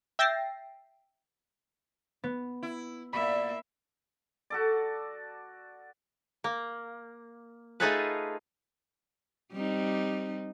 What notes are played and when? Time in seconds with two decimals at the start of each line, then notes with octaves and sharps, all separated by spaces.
0.19 E5 G5 A6 A#6 C7
2.24 B3
2.62 E4
3.13 A#2 A#3 E5 B5
4.50 F#4 A4 D5
6.44 A#3
7.80 A3 D#4 F4 G#4 A4 B4
9.53 G3 C4 D#4